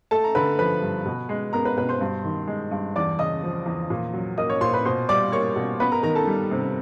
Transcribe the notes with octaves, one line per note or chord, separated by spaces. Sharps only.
A3 A4 A5
A#5
D3 B4 B5
F3 B4 B5
G2
B2
G#3
B3 A#4 A#5
B4 B5
B2 B4 B5
C5 C6
G2
D#3
G#3
G2
E2 D5 D6
C#3 D#5 D#6
F3
E2
A#2
F#3
A#3 D#5 D#6
C#5 C#6
A#2 C5 C6
B4 B5
B2 C5 C6
G3 D5 D6
A#3 C#5 C#6
B2
B3 B4 B5
A#4 A#5
D#3 A#4 A#5
A4 A5
G3
C3